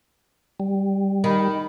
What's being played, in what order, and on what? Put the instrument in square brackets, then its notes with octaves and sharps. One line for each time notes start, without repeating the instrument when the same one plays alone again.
[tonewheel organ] G3
[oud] D#3 [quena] B5